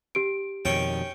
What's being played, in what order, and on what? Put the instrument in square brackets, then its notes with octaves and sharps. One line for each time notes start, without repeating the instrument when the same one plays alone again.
[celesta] G4 D7
[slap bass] F2 B2 D#3 [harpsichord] C#4 G5